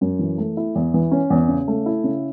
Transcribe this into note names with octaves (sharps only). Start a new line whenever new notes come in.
F#2
E3
A3
E4
E2
E3
C#4
E2
C#3
A3
E4
C#3